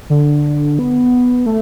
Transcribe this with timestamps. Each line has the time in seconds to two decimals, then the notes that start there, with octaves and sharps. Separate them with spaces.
0.10 D3
0.79 B3
1.46 A3